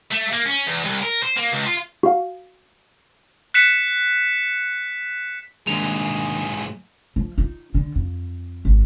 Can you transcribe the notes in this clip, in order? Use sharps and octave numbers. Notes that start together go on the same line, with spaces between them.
A3
A#3
C#4
E2
C2
A#4
C5
A#3
C#2
F4
F#4 F5
F#6 B6 C#7 E7
G#2 D#3 F#3 A#3 D4 G#4 F7
F3
D#4 F4
D3
F2
G#1 D3